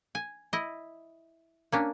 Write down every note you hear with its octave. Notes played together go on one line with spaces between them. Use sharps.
G#5
E4 D#5
A#3 C#4 D4